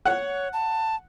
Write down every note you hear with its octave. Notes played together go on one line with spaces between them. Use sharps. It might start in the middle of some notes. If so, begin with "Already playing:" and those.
C#5 F#5
A5